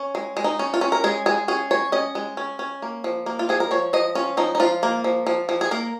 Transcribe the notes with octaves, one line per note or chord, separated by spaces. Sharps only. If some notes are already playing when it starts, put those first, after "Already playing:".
Already playing: C#4
G#3
G#3
D#4
C#4
F4
C#4
A#4
G#3 G#4
G#3 G#4
C#4 G#4
G#3 C#5
C#4 D#5
G#3
C#4
C#4
A#3
F3
A#3
F4
F3 G#4
A#4
F3 C#5
F3 D#5
C#4 F4
F3 D#4
D#4
F3 F4
A#3
F3
F3
F3
G#4
A#3 A#4